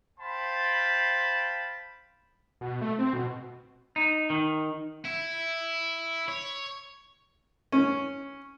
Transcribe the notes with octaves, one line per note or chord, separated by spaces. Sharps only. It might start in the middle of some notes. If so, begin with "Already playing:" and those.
C5 F5 G5 A5 B5 C6
B2
A3
C4
B2
D#4
D#3
E4
C#5
C#4